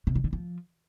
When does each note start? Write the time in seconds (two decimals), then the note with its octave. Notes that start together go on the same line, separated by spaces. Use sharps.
0.07 C3
0.16 F3
0.24 D3
0.33 F3